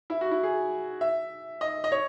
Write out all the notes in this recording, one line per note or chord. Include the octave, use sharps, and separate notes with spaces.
E4
F#4
E4
G#4
E5
D#5
D#5
C#5